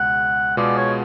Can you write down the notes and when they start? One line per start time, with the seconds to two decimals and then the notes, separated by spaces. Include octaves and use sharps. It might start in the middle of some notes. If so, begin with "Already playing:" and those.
Already playing: C#2 B2 G#3 F#5
0.57 B2 G#3 B3 F4 G#4 D5
0.77 C#5